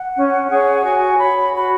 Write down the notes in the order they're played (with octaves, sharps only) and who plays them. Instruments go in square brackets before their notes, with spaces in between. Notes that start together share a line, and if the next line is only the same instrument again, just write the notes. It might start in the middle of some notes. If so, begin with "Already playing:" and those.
Already playing: [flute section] F#5
C#4
G#4 C#5
F#4 G#5
C#5 B5
F#4 B5